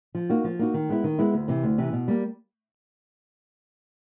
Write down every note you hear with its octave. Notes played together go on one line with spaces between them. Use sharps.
F3
A#3 D#4 F#4
F3
A#3 D#4 F#4
D#3
G#3 B3 E4
D#3
G#3 B3 E4
D2
C3 E3
D2
C3 E3
B2
G3 A#3